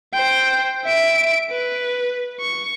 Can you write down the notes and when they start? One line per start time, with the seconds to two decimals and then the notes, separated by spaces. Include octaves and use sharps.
0.13 C5 G5
0.84 E5 D7
1.51 B4
2.40 C#6